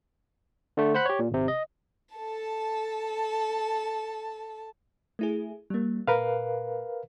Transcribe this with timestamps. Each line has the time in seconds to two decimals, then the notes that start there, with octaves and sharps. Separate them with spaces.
0.77 D3 A3
0.94 C5 F#5 B5 F#6
1.06 G4 C#5
1.19 A#2
1.31 G#1 C3
1.48 D#5
2.15 A4 A5
5.19 A3 E4 G#4
5.70 G3 A#3
6.07 A#2 A#4 B4 F5